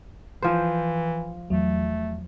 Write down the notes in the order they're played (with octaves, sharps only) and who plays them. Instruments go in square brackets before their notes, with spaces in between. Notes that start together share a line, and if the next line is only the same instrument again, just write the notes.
[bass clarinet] E3 [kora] F3 C5
[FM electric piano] E2 F#3 [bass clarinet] A3